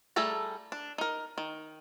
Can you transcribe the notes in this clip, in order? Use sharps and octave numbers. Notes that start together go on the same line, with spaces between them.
G3 A3 G#4 A4 A#5
D4
D#4 A#4
D#3